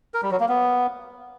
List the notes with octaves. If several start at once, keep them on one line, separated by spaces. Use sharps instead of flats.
A#4
G3
F#3
A#3
B3